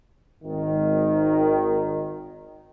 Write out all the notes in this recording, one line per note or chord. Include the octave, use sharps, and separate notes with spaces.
G#1 D#3